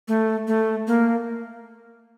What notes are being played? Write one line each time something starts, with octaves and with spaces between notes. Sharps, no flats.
A3
A3
A#3